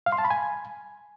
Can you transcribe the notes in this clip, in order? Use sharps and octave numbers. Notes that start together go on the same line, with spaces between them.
F5
C6
A5
B5
G#5